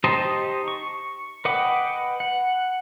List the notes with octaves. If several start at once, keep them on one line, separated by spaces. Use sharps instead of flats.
D#4 G4 C5 D#5 A5
C#6
B4 D#5 F#5 G5 D6
F#5